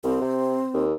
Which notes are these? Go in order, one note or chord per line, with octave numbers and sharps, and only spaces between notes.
C2 C4
C3
D#2